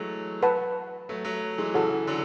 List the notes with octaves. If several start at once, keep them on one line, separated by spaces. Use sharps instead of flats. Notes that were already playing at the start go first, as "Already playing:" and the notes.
Already playing: E3 F#3 G#3 A3
B4 F#5 A5
F#3 A3
F#3 A3
E3 G#3
C#3 E3 F#4 A4 C#5 F#5
D3 F#3